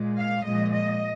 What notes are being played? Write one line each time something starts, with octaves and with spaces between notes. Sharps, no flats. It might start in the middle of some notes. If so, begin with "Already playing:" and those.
Already playing: A#2 G#3
F5
A#2 F3 G#3 D#5
D#5